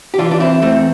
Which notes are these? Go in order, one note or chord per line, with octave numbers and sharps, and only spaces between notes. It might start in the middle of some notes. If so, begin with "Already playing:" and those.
G4
E3 D4 F4
D4
C4 E4
E2 A3 C4